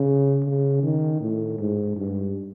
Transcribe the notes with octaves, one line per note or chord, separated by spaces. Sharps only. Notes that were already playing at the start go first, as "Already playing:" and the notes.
Already playing: C#3
C#3
D#3
A2
G#2
G2